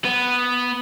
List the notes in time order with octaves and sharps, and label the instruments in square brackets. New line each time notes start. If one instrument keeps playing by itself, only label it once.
[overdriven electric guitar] B3